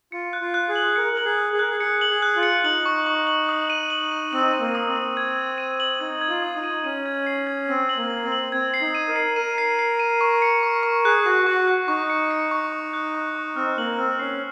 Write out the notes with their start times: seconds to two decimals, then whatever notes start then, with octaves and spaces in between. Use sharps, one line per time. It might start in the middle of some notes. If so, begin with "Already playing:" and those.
0.12 F4 C#7
0.33 F#6
0.41 F4
0.54 F#6
0.69 G#4
0.76 F#7
0.96 A#4 C#7
1.13 A#4 F#7
1.24 G#4
1.39 F#6
1.53 G#4
1.59 A#4 F#6
1.69 G#4
1.80 G#4 C#7
2.01 F#7
2.08 G#4
2.22 F#6
2.36 F4
2.43 C#7
2.64 D#4 F#7
2.86 C#6
3.06 C#6
3.27 F#7
3.49 D#6
3.70 D#7
3.90 F#7
4.12 D#7
4.33 C4 D#7
4.53 D#7
4.60 A#3
4.75 D#6
4.89 C4
4.96 D#6
5.17 G#6
5.37 G#6
5.58 D#7
5.80 F#7
6.01 D#4 G#6
6.21 G#6
6.28 F4
6.42 D#6
6.56 D#4
6.64 D#7
6.84 C#4 D#7
7.06 G#6
7.27 C7
7.47 G#6
7.68 C4 G#6
7.89 F#7
7.97 A#3
8.10 F#7
8.24 C4
8.32 F#7
8.52 C4 G#6
8.74 C7
8.81 D#4
8.95 D#7
9.08 A#4
9.16 C7
9.36 A#4 D#7
9.58 C7
9.79 C7
9.99 D#7
10.21 C#6
10.42 C#7
10.63 C#6
10.83 C#6
11.05 G#4 F#6
11.26 F#4 C#6
11.46 F#4 C#6
11.67 F#6
11.88 D#4 C#6
12.10 C#7
12.31 C#7
12.51 C#6
12.72 C#6
12.94 F#6
13.14 C#6
13.35 C#6
13.56 C4 F6
13.78 A#3 F#7
13.98 C4 F6
14.19 C#4 C7